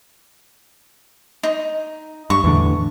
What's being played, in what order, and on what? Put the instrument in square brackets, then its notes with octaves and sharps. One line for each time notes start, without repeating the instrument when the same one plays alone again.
[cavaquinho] D#4
[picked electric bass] G2 [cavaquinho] C#6
[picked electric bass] E2 A2 D3